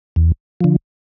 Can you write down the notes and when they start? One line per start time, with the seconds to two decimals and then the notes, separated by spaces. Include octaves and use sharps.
0.16 E2
0.61 D3 F3